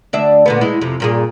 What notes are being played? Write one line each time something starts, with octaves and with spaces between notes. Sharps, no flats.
D2 D4 E5
A#2 D3 B3
G#3 E4
F2 C3
G2 A#2 G#4